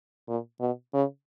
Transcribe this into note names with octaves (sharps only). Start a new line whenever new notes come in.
A#2
B2
C#3